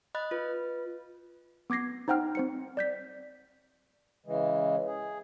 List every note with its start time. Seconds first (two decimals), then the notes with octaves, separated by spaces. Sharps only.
0.15 D#5 B5 F#6 A6
0.31 F4 B4
1.70 B3 D6 G#6 A#6 C7
2.08 D#4 C5 F#5 G5 F6
2.35 C4 C5 C#7
2.77 D5 G6 B6
4.26 C#3 E3 G#3
4.87 G#4